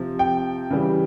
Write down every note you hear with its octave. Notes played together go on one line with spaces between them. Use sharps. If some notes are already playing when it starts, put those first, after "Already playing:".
Already playing: C3 F3
G5
C#3 E3 G3